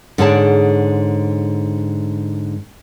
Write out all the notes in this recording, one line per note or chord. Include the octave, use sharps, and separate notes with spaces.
G#2 D3 G#4 C#5 D5 A5